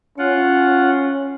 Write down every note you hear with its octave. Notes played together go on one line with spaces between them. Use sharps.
C#4 F4 F#5